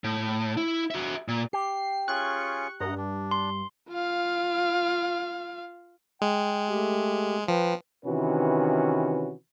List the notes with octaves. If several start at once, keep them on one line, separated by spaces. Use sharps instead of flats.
A2
E4
F#4 E5
A#2
G4 C7
C#4 F4 G#4 C#6 F#6
G2 D#5 F#5 A#5
D4
C6
F4 F5
G#3 G5
A3 G4
F3 B4 G5
C3 D#3 E3 C#4 F#4 B4